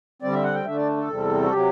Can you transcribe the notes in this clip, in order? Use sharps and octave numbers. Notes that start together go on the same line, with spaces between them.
D3 G3 C4 D5
E5
F#5
G5
D3 A3 D4 E5
D5
A4
E2 C3 G3 C4
F#4
C3 F#3 G4